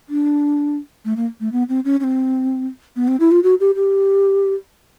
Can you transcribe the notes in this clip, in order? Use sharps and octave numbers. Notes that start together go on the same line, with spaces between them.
D4
A3
A#3
A3
B3
C4
C#4
C#4
C4
B3
C4
E4
F4
F#4
G4
G4